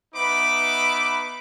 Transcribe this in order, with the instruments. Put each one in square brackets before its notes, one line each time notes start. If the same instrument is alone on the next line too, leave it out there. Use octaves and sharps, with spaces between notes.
[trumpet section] B3 D#4 B4 E5 B5 D6